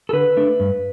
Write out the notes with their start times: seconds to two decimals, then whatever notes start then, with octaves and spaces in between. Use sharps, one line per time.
0.09 A4
0.13 D3 B4
0.37 A3 D4
0.60 G2